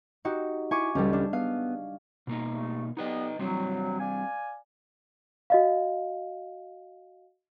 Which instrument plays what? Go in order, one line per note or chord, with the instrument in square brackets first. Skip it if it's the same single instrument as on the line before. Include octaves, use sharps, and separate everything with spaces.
[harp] D#4 F#4 G4
[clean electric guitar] E4 [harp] G#5 C#6 D6
[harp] C#2 G3 [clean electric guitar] C#4 G4 A4
[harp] D4
[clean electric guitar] B3 [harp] F5
[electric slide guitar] B2 A#3 D#4
[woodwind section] G2 A3
[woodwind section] G3 B3 [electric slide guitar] D#4 B4 D#5
[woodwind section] F#3 [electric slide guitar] G3 C4 D4
[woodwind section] D5 F5 G#5
[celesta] F#4 D#5 F5